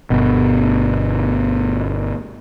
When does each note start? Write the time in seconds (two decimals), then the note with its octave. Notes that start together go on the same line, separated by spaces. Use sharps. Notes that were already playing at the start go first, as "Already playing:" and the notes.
0.10 G1 B2